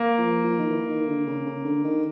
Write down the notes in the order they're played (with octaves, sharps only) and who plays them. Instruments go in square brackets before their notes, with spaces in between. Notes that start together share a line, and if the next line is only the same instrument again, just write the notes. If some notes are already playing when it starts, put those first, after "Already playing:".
Already playing: [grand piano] A#3
[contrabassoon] F3
F3
D#3
E3
D#3
D3
C#3
C#3
D3
D#3